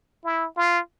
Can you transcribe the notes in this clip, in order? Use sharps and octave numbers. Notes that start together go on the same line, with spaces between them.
E4
F4